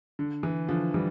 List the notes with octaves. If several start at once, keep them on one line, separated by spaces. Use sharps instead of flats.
D3
E3
D3 F3
E3 G3